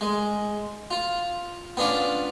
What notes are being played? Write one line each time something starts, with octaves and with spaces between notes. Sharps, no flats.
G#3
F4
B3 C#4 D4 F4